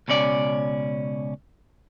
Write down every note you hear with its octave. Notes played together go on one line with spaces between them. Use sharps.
C#2 B2 C#4 D5